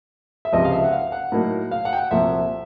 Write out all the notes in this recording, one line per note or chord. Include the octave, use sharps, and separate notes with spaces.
E5
C#2 C3 F3 D#5
F5
E5
F#5
F5
F#5
A2 F#3 A#3 D#4
F5
F#5
G5
F#5
C2 A#2 F3 A3 E5